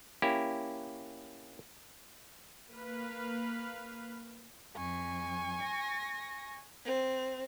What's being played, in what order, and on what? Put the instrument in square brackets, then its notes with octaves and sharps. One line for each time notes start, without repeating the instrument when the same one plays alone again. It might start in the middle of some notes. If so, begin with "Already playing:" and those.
[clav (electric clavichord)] A#3 C#4 E4 G4
[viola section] A#3 B4 F5
[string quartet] F2 [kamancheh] G#5 C#6
[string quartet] A#6
C4